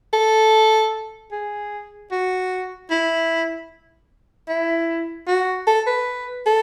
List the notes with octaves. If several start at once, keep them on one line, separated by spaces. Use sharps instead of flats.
A4
G#4
F#4
E4
E4
F#4
A4
B4
A4